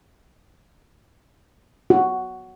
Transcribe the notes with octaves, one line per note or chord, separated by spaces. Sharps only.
F#4